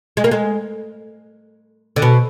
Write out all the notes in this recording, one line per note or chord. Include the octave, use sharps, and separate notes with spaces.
G#3
A#3
G#3
D3
B2